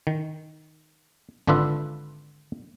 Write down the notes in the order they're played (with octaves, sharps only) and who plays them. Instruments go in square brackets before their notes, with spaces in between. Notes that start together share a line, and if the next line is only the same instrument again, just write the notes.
[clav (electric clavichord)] D#3
G#1 D3 D4 F4 B4 E5